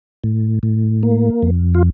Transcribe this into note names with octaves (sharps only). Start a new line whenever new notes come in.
A2
A2
A#3
F2
F4